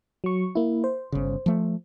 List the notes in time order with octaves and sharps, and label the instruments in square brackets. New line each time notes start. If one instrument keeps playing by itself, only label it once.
[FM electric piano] F#3 C#6
A#3 E4
C5
[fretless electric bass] G1 C#3
F3 A3